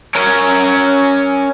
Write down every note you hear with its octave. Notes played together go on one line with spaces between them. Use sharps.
C#4 A#4